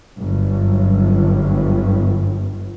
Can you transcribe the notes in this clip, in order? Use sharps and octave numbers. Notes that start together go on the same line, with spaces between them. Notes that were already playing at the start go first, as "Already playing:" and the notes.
G1 F#2